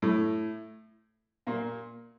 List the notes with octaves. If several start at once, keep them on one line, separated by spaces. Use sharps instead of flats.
A2 A3
A#2 A#3